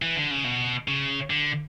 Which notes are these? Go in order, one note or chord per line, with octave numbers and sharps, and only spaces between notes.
E3
D3
C#3
B2
C#3
D3